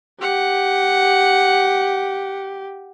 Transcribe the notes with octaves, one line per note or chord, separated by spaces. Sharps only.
G4 F#5